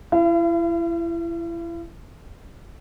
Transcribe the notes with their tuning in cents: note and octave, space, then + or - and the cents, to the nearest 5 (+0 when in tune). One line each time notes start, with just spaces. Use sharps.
E4 +30 F5 -45